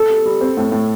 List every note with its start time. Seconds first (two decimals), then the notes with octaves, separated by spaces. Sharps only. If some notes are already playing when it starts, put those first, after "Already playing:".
Already playing: A4
0.10 G3
0.25 G3
0.41 C4
0.57 A2
0.72 A2